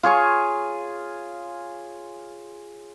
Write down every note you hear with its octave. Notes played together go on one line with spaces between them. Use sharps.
F4 G#4 C#5 C#6